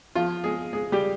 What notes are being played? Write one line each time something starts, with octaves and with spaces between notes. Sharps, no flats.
F3 F4
G#3 G#4
G#3 G#4
G3 G4